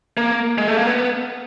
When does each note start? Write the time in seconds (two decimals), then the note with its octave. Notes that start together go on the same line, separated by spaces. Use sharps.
0.17 A#3
0.58 G#3
0.68 A3
0.77 A#3
0.87 B3